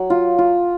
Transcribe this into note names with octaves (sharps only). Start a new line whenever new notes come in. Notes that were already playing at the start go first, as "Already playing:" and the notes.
Already playing: F#3
F4
F4